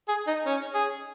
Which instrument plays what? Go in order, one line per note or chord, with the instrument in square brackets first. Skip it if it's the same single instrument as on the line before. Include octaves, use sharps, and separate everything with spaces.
[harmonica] G#4
D#4
C#4
G#4